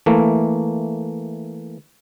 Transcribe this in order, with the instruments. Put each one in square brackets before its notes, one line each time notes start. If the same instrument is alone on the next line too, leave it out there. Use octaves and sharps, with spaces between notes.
[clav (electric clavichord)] E3 A3 A#3